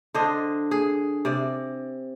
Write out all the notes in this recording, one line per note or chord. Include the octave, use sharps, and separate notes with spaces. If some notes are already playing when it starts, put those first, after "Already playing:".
D3 D4 C5 D#5
G#4
C3 D5